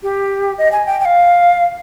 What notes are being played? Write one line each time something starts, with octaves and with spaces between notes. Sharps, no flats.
G4
D#5
G#5
G5
G5
F5